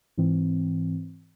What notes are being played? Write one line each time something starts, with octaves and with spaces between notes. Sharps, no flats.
G#2 E3 C4